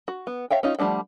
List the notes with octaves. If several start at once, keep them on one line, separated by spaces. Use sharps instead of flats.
F#4
B3
C#5 E5 F5 G5
C#4 D#4 F4
F3 G3 A3 D4 F#5